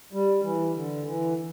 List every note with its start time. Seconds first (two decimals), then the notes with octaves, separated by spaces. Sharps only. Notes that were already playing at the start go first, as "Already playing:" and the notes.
0.13 G3
0.44 E3
0.75 D3
1.06 E3